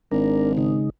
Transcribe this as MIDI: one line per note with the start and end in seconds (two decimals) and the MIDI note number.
0.11 0.85 32
0.11 0.52 56
0.11 0.52 62
0.11 0.52 70
0.58 0.90 49
0.58 0.90 56
0.58 0.90 63